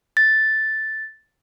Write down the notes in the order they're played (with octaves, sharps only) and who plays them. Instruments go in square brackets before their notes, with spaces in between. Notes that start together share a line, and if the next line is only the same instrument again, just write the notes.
[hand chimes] A6